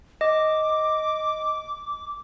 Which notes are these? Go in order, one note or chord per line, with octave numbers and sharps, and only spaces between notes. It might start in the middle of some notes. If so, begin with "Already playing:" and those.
D#5 D6